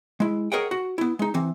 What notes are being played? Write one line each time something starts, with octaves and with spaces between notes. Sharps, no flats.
G#3 E4
G#4 A#4 C#5 D#5 F#5 G5
F#4
B3 E4
G#3 D#4
E3 C4